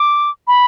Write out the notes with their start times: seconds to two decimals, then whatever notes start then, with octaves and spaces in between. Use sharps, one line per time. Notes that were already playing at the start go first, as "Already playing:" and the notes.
Already playing: D6
0.47 B5